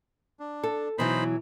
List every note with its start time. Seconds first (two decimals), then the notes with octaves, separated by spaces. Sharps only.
0.40 D4
0.64 A4
0.98 B2 E3 F#3 D#4 C5 B5